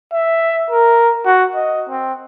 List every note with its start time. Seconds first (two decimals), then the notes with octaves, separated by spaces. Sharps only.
0.13 E5
0.71 A#4
1.25 F#4
1.55 D#5
1.88 C4